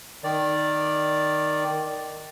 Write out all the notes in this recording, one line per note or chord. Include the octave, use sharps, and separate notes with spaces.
D#3 D5